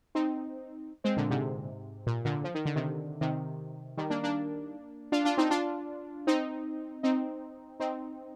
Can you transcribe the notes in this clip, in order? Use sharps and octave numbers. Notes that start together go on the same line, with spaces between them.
C4 D#4
G#3 C4
A#2 D3
G#2 C3
A#2
A#2 D3
F3
D#3
D3
C3 D#3
C3 D#3
D#3 G3
A#3 D4
A#3 D4
D4 F4
D4 F4
C4 D#4
D4 F4
C4 D#4
C4 D#4
C4 D#4